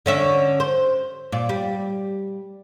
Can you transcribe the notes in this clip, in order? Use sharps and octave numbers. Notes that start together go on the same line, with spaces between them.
D3 C#4 E5
C5
A#2 D5
G3